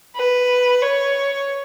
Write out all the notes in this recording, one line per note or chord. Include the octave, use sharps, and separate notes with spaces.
B4
C#5